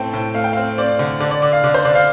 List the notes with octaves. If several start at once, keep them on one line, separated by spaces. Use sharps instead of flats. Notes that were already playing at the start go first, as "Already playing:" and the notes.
Already playing: A2 A3 C4 G5 A5
A2
A3 F5
G5
C4 F5
C4 D5
D3
D3 D5
D5
D3 D5
F5
D3 D5
C5
D3 D5
F5